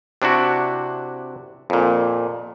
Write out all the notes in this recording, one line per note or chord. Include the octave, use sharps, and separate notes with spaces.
C3 D4 E4 F#4
F2 A#2